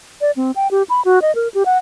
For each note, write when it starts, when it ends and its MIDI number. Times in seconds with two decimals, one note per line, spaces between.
0.21 0.31 74
0.36 0.51 60
0.56 0.68 79
0.71 0.83 67
0.90 1.04 83
1.05 1.19 66
1.22 1.34 75
1.35 1.48 70
1.54 1.63 67
1.66 1.78 78